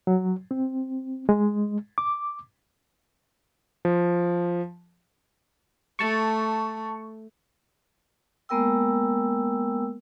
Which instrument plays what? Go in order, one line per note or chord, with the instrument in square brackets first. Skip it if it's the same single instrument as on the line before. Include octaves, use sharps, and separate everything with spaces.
[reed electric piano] F#3
C4
G#3
D6
[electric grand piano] F3
[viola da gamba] A3 [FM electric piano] A5 C#6
[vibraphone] G#3 A#3 B3 A#4 G5 E6